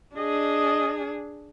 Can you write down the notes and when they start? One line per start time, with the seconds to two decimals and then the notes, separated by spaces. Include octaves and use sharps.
0.17 D4 G#4 D#5